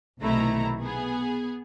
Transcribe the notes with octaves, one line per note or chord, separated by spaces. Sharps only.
B1 C3 D#3 A3 E4 A#5
B3 G#4